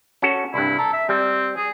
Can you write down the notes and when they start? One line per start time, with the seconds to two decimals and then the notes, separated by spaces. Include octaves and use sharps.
0.22 C#4 F#4 A4
0.54 C2 G2 E4
0.79 A4 A#5
0.93 E5
1.09 G3 C4
1.56 G#4